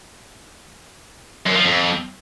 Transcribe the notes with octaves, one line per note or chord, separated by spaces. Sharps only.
F#2
F3
F2